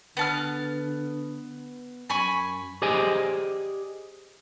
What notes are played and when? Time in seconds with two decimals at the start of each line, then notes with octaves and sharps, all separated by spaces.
0.17 D3 B3 A5 F6
2.10 F#2 G#5 B5 C#6
2.82 G4 G#4 C5 D5 D#5 G#5